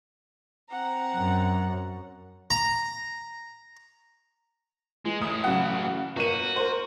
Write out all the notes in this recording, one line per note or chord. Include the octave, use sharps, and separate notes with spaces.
C4 F#5 A#5
F#2
A#5
E3 G#3
A2 E3 D#6
C#3 F#3 F#5
G1 A#3 F#4 D#7
A#4 C5